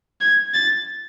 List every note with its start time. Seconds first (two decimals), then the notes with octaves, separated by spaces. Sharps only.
0.21 G#6
0.54 A6